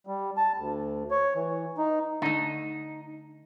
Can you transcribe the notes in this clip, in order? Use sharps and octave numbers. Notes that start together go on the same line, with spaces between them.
G3
A5
D2
C#5
E3
D#4
D3 A3 D#4